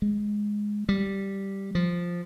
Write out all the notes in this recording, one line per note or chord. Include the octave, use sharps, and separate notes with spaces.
G#3
G3
F3